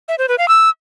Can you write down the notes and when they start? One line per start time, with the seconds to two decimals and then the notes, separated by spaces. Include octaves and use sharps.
0.08 E5
0.18 C5
0.28 B4
0.38 F5
0.48 E6